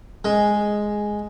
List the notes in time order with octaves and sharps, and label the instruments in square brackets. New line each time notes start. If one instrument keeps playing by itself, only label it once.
[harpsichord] G#3